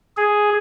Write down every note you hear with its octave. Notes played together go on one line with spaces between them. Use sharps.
G#4